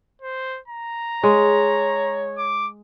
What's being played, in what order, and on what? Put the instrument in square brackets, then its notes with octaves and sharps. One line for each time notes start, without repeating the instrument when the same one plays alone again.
[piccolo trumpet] C5
A#5
[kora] G#3 [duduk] C#5
[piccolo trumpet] D6